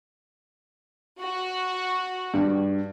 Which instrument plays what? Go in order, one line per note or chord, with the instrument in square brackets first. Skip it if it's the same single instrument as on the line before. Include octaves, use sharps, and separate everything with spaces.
[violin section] F#4
[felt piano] G2